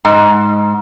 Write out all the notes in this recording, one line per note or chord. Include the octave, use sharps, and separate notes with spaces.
G#2